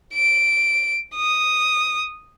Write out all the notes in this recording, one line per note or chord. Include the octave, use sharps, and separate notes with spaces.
D7
D#6